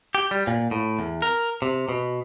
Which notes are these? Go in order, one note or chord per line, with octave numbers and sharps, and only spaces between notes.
G4
G3
A#2
A2
E2
A#4
C3
B2